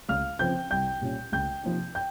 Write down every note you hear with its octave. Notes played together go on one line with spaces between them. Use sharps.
C#2 F5 F6
C#3 F3 C4 G5 G6
C2 G5 G6
A#2 G3 C#4
C#2 G5 G6
C3 F3 A#3 D#4
G5 G6